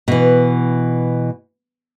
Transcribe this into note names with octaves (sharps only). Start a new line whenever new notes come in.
B2 E3